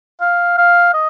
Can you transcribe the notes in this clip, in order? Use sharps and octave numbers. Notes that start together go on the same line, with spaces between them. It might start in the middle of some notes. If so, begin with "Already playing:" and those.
F5
F5
D#5